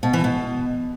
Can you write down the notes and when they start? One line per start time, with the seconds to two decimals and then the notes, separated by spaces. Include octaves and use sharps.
0.03 B2
0.13 E3
0.24 B2